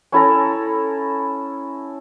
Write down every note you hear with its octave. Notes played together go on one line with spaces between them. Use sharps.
C#4 E4 A4 A#5